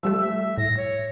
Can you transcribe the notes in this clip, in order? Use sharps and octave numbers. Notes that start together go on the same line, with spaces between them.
F3 G3 A3 E6
E5
A2 A#6
C#5